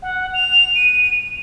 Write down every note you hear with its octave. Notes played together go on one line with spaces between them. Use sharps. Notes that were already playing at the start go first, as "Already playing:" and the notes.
F#5
F7
D#7